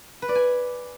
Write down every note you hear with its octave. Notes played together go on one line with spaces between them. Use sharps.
B4
D5
G#5